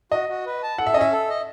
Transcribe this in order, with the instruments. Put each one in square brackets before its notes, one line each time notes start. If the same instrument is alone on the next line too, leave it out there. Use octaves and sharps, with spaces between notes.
[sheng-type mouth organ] F#4 [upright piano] D#5
[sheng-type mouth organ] F#4
B4
A5
[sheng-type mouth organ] A4 [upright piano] F#5
[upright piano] E5
[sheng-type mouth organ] C#4 [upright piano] D#5
[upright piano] E5
[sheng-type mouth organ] A4
D#5